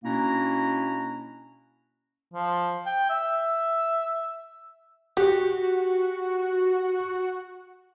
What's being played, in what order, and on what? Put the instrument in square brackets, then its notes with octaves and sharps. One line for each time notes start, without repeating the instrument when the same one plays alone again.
[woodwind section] B2 A#3 C#4 D4 E4 A#5
[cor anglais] F3
G5
E5
[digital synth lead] F#4 [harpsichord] G4